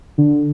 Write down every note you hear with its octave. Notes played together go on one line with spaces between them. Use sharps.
D3